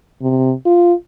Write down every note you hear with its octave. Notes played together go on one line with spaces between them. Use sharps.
C3
F4